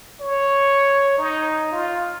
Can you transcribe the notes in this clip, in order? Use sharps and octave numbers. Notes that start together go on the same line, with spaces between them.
C#5
D#4
F4